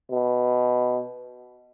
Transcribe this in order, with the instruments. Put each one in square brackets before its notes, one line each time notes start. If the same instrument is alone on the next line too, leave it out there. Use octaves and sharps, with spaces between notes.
[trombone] B2